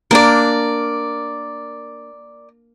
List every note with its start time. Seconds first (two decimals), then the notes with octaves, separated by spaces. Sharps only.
0.11 A#3 D4 A#4 D5